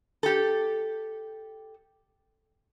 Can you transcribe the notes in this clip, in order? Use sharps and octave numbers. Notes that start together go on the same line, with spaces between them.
G4 A4